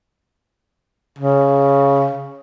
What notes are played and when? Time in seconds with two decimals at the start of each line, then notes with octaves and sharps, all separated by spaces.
1.19 C#3